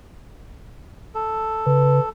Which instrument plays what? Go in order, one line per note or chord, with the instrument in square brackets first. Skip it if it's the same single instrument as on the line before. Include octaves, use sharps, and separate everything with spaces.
[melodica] A4
[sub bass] C#3 [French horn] B4